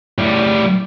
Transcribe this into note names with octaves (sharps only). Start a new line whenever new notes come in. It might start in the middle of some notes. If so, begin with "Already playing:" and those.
A2 G3